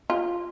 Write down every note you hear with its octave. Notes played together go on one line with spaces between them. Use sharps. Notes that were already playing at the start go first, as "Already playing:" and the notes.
F4